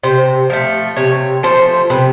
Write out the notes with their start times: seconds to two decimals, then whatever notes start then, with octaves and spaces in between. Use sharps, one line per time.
0.03 C3 C5
0.50 F3 A3
0.96 C3 C#5
1.43 F3 A3 C5
1.90 C3 B4